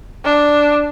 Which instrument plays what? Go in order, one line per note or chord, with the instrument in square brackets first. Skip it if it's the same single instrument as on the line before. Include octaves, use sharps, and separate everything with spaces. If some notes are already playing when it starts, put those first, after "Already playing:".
[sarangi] D4